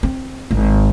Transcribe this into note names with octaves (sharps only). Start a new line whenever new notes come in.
C4
G#1